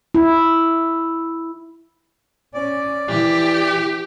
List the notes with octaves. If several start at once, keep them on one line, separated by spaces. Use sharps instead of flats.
E4
C#4 D5
E3 G4